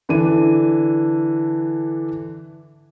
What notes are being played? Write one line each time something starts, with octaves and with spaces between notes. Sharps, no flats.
D3 E3 D4 D#7